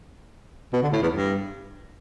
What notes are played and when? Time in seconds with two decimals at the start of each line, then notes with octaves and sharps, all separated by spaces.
0.73 B2
0.82 D3
0.92 A2
1.02 E2
1.12 G2